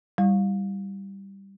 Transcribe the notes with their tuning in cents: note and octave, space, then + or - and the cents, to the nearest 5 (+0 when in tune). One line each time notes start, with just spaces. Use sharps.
G3 +0 E4 +0